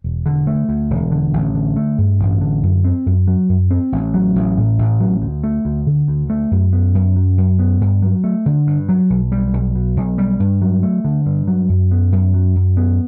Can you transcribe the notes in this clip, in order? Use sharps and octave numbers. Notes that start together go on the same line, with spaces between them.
E1
D3
A3
D2
E1
D3
A1
D3
A3
G2
A1
D3
F#2
C4
F#2
F#3
F#2
C4
A1
F#3
A1
A2
A1
F#3
D2
A3
D2
D3
D2
A3
F#2
B3
F#2
F#3
F#2
B3
G2
F#3
A3
D3
G2
F#3
B1
G3
B1
B2
B1
G3
G2
F#3
A3
D3
G2
F#3
F#2
B3
F#2
F#3
F#2
B3